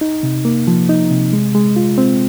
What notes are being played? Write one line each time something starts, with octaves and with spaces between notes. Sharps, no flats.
D#4
C3
A#3
F3
D#4
C3
G#3
G#3
F4
C4